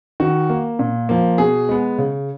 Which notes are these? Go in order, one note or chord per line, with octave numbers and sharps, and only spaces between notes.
D#3 F#4
A#3
A#2
F3 A#3
B2 G#4
G#3 B3
C#3